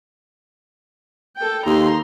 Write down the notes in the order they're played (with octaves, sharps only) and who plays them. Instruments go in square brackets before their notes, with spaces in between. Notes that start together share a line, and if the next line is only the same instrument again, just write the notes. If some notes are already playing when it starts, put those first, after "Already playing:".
[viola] A4 G5
[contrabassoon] D#2 [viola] A#5 C6